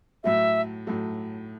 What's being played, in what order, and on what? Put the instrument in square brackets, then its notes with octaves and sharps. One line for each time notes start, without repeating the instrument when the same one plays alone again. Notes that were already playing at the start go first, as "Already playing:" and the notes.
[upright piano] A2 F#3 A3 [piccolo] E5
[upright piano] A2 F#3 A3